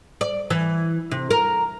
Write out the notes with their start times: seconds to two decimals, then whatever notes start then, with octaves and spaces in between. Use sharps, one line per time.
0.21 D5
0.50 E3
1.11 C3
1.31 A#4